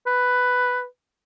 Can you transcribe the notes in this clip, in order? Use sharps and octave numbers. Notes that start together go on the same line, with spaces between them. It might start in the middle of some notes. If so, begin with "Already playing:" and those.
B4